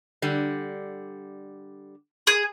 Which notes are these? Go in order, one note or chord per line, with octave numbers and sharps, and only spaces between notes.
D3 G3
G#4